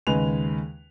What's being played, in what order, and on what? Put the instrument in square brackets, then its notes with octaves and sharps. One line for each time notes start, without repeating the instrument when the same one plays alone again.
[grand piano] D#2 C#3 G#3 B4 G#5 F7